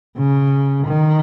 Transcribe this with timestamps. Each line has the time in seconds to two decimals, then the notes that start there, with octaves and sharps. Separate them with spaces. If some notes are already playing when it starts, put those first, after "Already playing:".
0.17 C#3
0.87 D#3